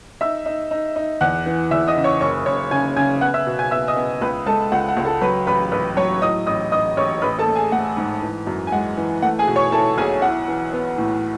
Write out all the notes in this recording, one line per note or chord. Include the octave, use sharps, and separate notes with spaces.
D#4 E5 E6
D#4
D#4
D#4
E2 F#5 F#6
E3
E2 E5 E6
D#5 D#6
C#3
C#5 C#6
F#1 C#5 C#6
F#1 C#5 C#6
C#3 G#5 G#6
C#3 G#5 G#6
B3 F#5 F#6
E5 E6
B2
G#5 G#6
B3 E5 E6
D#5 D#6
B3
C#2 B4 B5
G#3 A4 A5
C#2 F#5
F#5
C#2
A4 A5
F#3 B4 B5
A1 B4 B5
A1 B4 B5
F#3 C#5 C#6
A2 D#5 D#6
A1 D#5 D#6
A1 D#5 D#6
A1 C#5 C#6
A1 B4 B5
A4 A5
A3
G#4 G#5
A3 F#5
G#2
E3
F#2
G#5
G#3 F#5
E3
A3 F#5
G#4 G#5
B2
C#5 C#6
E4 A4 A5
B1 G#4 G#5
E4 F#5
E3
B3
A2